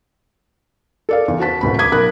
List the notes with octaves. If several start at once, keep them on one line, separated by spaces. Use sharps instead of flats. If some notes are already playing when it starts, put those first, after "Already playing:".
A4 D5 F5
E2
F#4 C5 A5 B6
D#1 D2 B5
D6 D#6 G#6 B6
B1 A#4 B5 F#6